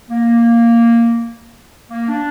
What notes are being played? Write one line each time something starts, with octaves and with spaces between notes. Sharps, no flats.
A#3
A#3
D4